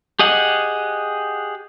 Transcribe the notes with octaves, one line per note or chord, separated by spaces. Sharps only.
G4 G#4 D#5 F#5